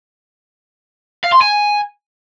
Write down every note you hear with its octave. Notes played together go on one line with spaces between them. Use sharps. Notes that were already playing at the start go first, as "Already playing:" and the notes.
F5
C6
G#5